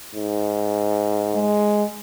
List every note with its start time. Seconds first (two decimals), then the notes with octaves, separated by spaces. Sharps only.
0.14 G#2
1.35 G#3